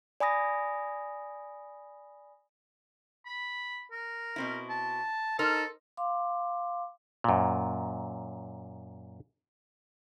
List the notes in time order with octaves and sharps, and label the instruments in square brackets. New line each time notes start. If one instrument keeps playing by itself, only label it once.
[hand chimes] D5 G#5 B5 D#6 A#6
[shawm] B5
A#4
[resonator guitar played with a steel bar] B2 C4 E4
[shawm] A5
[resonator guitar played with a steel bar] D#4 A#4 C5 [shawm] A4
[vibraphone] F5 C6 D6
[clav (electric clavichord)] F#2 A#2